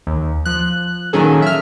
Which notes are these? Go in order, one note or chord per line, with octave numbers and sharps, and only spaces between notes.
D#2
F3 F#6
A#2 D#3 F#3 C#4 G#4 A4
E5 F6